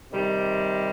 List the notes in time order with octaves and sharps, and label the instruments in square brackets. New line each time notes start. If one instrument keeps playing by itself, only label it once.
[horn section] C3 D#3 G3